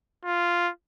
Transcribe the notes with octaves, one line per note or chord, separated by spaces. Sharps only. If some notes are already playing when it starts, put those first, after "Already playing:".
F4